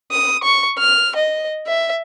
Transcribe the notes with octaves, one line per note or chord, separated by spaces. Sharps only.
D#6
C#6
F6
D#5
E5